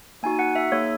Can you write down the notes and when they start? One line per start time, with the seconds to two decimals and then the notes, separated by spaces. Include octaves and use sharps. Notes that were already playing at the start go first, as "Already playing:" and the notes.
0.23 A#3 D#4 F#4 G#5
0.39 F#5
0.55 E5
0.71 A#3 D#4 G#4 C#5